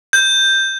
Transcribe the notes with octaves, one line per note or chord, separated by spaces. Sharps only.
G6